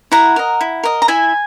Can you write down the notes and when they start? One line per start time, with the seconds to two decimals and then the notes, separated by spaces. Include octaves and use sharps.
0.12 E4 F#5 A#5
0.36 A#4 D#5
0.61 E4
0.83 A#4 D#5
1.02 A#5
1.08 E4 E5 G#5